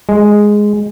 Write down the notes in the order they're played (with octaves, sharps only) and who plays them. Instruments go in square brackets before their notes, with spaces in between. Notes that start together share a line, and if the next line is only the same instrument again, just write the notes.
[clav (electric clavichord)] G#3